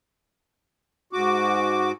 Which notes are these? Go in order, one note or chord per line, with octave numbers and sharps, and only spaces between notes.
G#2 F#4 D6